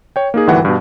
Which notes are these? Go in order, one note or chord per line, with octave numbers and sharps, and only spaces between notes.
C#5 G5
A#3 D#4 G#4
G#1 D2 G2 D#3 E3 F#5
G2 B2